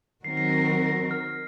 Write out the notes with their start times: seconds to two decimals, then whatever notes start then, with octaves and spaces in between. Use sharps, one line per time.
0.24 D#3 F#3 C4 F#4 A#4 C7
0.37 C7
0.50 A#6
0.61 C7
0.86 A#6
1.11 F6